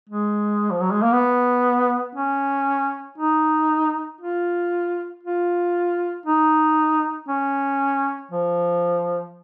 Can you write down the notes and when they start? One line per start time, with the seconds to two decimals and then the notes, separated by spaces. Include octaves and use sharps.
0.09 G#3
0.71 F3
0.81 F#3
0.91 G#3
1.02 A#3
1.12 B3
2.15 C#4
3.18 D#4
4.21 F4
5.23 F4
6.26 D#4
7.28 C#4
8.31 F3